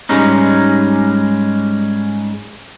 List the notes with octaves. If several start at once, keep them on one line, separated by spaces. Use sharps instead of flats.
G#2 G3 G#3 C#4 D#4